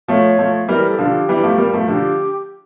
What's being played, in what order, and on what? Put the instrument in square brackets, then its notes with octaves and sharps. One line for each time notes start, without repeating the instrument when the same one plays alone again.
[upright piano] F3 A3 [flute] C#5
[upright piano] F3 A3
[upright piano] E3 G3 [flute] A#4
[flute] A4
[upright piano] D3 F3
[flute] G4
[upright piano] E3 G3
F3 A3
G3 A#3
F3 A3
[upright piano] D3 F3 [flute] G4